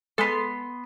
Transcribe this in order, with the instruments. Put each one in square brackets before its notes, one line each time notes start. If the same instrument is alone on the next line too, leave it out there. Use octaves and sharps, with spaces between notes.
[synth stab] G#3 A4 [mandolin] B3 C6